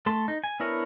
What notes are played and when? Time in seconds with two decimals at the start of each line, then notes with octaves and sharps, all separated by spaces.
0.06 A3 A4 C6
0.28 D#4
0.44 G#5
0.60 B3 D4 E4 A#4 C#5